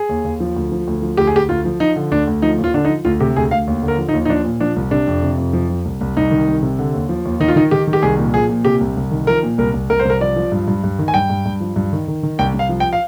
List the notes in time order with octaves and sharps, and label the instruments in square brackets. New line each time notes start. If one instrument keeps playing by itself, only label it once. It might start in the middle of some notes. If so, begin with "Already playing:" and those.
Already playing: [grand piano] G#4
D#2
D#2
F3
D2
F3
D2
F3
D2 G4
G#4
D2 G4
D2 F4
F3
F3 D#4
D3
D2 D4
D2
F3 D#4
D#2
F4
D3 D4
D#4
F3
D2 F4
C3 G4
D2 G#4
D2 F5
D#2
D3
A#4
F3
D#4
D#2
D#4
F3 D4
A#2
F3 D4
C2
C3 D4
F2
C3
F2
F3
F3
C2
C2
C2 D#4
D#3
C2
C3
D3
D#2
F3
D#2
D#3 D#4
F4
D#3 D#4
D#3 G4
D#3
G4
C2 G#4
A#2
F3 G#4
A#2
C3 G4
C2
C2
D#3
F3 A#4
A#2
C2 A#4
C2
C2 A#4
C5
C2 A#4
F3 D5
F3
G2
G2
G2
D#3
G#5
G2 G5
G2
G2
F3
G2
D#3
D#3
D#3
C2 G5
C2
F5
F3
G5
F5